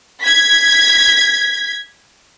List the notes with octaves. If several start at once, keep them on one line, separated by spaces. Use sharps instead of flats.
G#6 B6